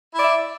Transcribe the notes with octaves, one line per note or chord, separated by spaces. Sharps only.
E4 D5 E5